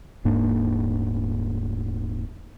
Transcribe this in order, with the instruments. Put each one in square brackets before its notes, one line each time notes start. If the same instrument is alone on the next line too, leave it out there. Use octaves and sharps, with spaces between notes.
[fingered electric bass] D#1 G#2 A#3 D4